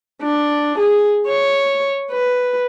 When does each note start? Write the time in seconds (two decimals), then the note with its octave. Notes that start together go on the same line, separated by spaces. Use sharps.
0.22 D4
0.79 G#4
1.27 C#5
2.11 B4